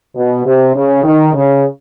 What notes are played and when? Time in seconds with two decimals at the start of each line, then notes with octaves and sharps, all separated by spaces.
0.16 B2
0.45 C3
0.75 C#3
1.04 D#3
1.33 C#3